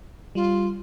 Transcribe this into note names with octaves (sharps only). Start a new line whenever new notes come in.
G3 F4